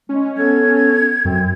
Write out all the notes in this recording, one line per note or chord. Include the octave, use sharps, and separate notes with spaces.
G#3 C#4
B3 A4 G#6
F#2 C4